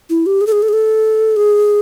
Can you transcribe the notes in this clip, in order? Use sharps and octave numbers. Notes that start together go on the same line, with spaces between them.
E4
G4
G#4
A4
G#4
A4
G#4
A4
G#4